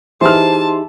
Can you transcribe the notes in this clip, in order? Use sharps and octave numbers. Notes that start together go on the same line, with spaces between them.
E3 D#4 G4 G#4 C5 A5 C6 F6